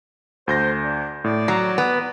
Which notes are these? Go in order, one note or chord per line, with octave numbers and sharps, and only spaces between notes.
D2 C5 G6 A#6
D4
A2 D5
F#3 A#5
B3